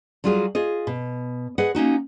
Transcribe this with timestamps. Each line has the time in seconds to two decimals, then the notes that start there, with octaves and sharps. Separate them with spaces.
0.24 F#3 G3 F4 F#4 G#4
0.55 F4 G#4 D#5
0.87 B2
1.58 G#4 B4 D#5 F#5
1.75 A#3 C#4 D#4 F#4